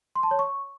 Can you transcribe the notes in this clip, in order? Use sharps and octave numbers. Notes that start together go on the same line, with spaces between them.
C6
A5
C#5
C#6